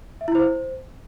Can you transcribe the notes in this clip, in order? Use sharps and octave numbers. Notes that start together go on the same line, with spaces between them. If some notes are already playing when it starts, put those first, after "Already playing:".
E5
E4
C5